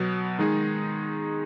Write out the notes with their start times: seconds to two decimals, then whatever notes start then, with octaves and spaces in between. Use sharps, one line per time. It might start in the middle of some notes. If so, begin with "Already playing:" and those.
Already playing: B2 F#3 B3
0.39 D#3 G#3 D#4 G#4